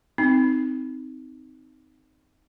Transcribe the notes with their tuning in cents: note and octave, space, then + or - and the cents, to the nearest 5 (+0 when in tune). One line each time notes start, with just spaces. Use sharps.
C4 -10 D#4 +0